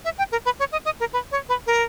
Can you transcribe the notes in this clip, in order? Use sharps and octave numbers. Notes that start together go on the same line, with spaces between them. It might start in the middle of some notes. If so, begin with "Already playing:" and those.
E5
G5
A#4
B4
C#5
D#5
D#5
A#4
B4
C#5
B4
A#4